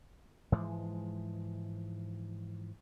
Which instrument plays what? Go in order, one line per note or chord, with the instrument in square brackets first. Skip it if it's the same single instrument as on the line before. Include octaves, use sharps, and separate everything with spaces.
[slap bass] G#2 E3 F3 G#3